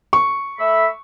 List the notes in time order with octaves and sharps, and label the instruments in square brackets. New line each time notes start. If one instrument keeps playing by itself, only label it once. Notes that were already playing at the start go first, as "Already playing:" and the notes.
[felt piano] C#6
[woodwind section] A3 E5 B5